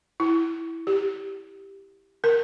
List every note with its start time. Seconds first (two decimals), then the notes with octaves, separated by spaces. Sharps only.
0.20 E4
0.87 G4
2.24 A#4